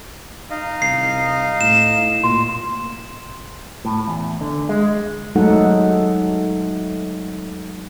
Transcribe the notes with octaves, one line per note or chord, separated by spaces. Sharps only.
D#4 D#5 F5
C2 C7
A2 E7
A#2 C6
A2
E2
D3
G#3
F#3 G#3 A3 D#4 A4 F#5